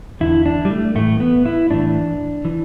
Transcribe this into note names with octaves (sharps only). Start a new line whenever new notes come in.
E2 D3 E4
D4
G3
A3
A2 E3 A3
B3
E4
A2 E3 D4
E3